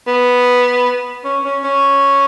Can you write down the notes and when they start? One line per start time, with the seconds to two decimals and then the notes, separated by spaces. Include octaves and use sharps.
0.08 B3
1.25 C#4
1.45 C#4
1.64 C#4